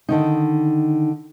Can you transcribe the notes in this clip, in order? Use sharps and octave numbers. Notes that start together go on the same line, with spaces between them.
D3 D#3 D#4